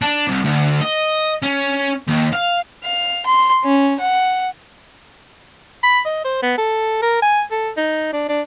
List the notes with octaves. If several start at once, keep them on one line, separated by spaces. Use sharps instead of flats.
D4
C2
D2
D#5
C#4
D#2
F5
F5
C6
C#4
F#5
B5
D#5
C5
B3
A4
A#4
G#5
A4
D#4
D4
D4